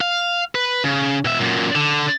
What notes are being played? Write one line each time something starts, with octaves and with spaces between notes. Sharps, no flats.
F5
B4
C#3
B2 E5
F#2 A#2
D3